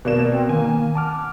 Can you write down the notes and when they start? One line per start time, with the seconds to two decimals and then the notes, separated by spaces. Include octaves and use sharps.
0.05 B2 A#3 D5 E7
0.30 C4
0.49 D#3 A#3 G#5
0.95 F#5 A5 D6 F6